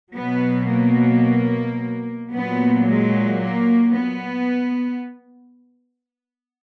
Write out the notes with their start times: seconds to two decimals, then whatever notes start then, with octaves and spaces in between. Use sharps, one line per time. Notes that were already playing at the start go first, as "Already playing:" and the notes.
0.15 B2 F#3 B3
0.69 A#3
2.32 A#2 F#3 B3
2.87 G#3
3.41 A#3
3.95 B3